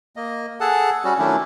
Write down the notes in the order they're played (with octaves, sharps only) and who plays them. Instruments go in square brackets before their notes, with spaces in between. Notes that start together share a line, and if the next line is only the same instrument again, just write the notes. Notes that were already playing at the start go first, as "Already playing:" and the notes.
[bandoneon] A#3 D#5
G#4 A4 F#5 A5
G3 C#4 F#4
D#3 F#3 A3 C#4 D4 E4